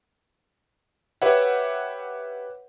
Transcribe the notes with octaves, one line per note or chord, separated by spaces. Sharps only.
G4 B4 C#5 E5 F#5